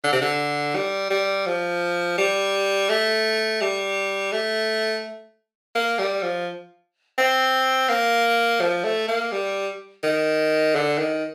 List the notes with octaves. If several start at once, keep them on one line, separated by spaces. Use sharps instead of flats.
D3
C3
D3
G3
G3
F3
G3
A3
G3
A3
A#3
G3
F3
C4
A#3
F3
A3
A#3
G3
D#3
D3
D#3